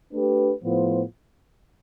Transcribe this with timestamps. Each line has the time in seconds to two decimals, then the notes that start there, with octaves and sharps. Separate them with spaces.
0.13 A3 D4 G4 B4
0.62 A2 F3 B3 F4 C5